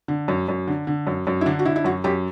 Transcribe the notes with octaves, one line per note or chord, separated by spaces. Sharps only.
D3
F#2
F#2
D3
D3
F#2
F#2
E4
D3 D4
F#4
D3 E4
E4
F#2 F#4
F#2 G4